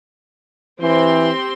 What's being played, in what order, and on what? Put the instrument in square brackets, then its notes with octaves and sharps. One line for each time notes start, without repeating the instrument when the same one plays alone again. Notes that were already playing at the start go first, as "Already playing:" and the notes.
[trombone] E3 [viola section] C4 G4 C6